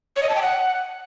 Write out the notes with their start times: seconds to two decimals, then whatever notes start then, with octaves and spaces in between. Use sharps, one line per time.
0.16 C#5
0.23 D#5
0.29 A5
0.35 G5
0.42 F#5